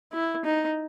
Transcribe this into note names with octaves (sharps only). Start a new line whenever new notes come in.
E4
D#4